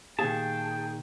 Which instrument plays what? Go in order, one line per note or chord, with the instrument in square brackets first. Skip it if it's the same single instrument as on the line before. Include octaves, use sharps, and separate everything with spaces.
[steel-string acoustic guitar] A#2 D#3 [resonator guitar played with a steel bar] G#4 [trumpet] G5 [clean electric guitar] A5